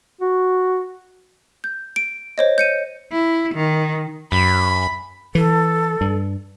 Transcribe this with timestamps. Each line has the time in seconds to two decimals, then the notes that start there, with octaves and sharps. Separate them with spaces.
0.21 F#4
1.64 G6
1.96 D7
2.38 C5 C#5 D#5
2.58 G6 C#7 D#7
3.12 E4
3.54 D#3
4.32 F#2 B5
5.35 E3 A4
6.01 G2